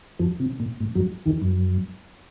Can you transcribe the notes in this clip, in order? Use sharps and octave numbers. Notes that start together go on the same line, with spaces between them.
F2 F3
C3
A#2
A2
F#2 F#3
D#2 D#3
F#2